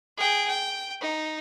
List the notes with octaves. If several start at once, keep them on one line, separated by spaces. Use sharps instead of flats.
G#4 G5
G5
D#4